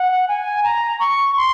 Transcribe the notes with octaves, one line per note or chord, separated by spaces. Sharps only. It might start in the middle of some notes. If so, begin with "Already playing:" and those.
Already playing: F#5
G#5
A#5
C#6
C6